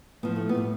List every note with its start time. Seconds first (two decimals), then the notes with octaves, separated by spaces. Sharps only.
0.23 A2 F3 B3
0.36 A3
0.49 B3
0.55 A2 G3